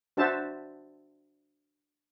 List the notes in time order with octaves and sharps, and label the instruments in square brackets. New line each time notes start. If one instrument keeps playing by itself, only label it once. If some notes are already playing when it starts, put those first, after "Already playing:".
[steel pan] D4 F#4 C5 E5 A5